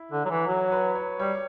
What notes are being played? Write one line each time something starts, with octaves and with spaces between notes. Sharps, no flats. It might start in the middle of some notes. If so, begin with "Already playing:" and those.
Already playing: E4
D3
F#3
E3
F#3 F#4
C#5
B4
C#5
G3 C#5